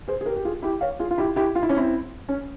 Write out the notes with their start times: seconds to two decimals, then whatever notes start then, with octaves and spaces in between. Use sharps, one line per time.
0.08 G#4 C5
0.21 G#4
0.26 G4 A#4
0.36 G4
0.45 F4 G#4
0.62 E4 G4
0.81 C#5 F5
0.99 F4 G#4
1.11 F4
1.18 E4 G4
1.36 E4 G4
1.55 F4
1.63 E4
1.69 C#4
1.77 C4 E4
2.29 C#4